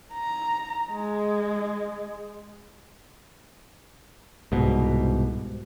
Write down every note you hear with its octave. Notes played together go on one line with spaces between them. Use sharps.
A#5
G#3
C2 G#2 B2